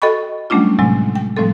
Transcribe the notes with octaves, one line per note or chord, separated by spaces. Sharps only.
F#4 A4 D#5 G5 B5 C#6
F#3 G3 A3 C#4 D4 F4
A2 C3 F#3 G#3 C4
G5
A2 F3 G3 A3 C4 A4